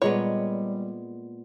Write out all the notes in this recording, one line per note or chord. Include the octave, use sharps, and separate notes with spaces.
A#2 G3 G#3 B3 C#5